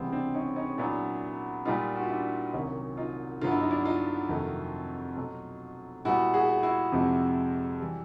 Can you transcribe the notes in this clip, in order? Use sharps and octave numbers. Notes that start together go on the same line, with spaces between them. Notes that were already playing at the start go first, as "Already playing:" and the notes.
Already playing: C#2 C3 E3 G3 B3 C4
C4 D4
C#4 D#4
C#4 D#4
A#2 F#3 B3 D4 E4
A#2 G3 B3 D#4 F4
F#4
F4
D4 E4
C2 C3 D#3 F#3 A#3 C#4 D#4
D#4 F4
G2 D3 F#3 B3 F4
E4
D#4
D4 E4
D#4 F4
F2 C3 D#3 F#3 A3
B2 F#3 A3
A#2 G3 B3 E4 F#4
F#4 G#4
E4 F#4
F2 C3 F3 G#3
E3 G3